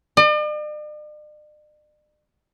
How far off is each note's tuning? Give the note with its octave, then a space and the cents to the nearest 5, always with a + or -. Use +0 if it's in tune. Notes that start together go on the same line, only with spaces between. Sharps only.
D5 +45